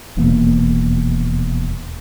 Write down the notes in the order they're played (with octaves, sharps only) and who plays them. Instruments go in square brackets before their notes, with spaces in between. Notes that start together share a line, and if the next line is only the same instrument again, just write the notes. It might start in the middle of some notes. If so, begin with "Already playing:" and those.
[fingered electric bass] D#1 E2 B2 A#3